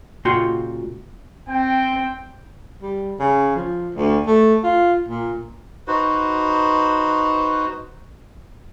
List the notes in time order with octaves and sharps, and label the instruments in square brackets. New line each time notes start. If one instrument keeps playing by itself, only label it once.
[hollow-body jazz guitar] C#2 A#2 F4 F#4 G5 C6
[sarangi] C4 [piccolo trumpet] G5
[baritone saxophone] G3
C#3
F3
D2
A3
F4
A#2
[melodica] D#4 F#4 B4 C5